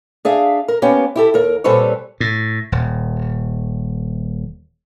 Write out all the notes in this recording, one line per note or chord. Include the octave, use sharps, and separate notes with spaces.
D4 G#4 E5 F5
A#4
A#3 B3 C#4 G4
E4 G4 A4
D#2 A#4
A#2 G3 C4 A4 B4 C#5
A2
D#1